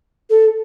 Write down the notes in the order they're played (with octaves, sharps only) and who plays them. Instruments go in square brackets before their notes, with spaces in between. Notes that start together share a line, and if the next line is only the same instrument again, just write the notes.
[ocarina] A4